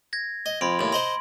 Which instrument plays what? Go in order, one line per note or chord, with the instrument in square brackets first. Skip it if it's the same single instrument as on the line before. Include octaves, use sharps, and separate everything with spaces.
[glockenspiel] G#6 A#6
[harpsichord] D#5
[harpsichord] F2 [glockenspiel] B5 C6 D7
[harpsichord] D#2 A2
[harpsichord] C5 D#5 A#5 [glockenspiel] C6